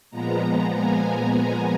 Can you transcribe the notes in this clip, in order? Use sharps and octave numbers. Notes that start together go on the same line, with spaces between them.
A#2 F3 G#3 B3 A#5
G#5